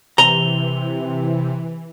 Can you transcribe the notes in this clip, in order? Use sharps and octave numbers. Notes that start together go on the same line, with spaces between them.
C3 E3 A#5 F7 G7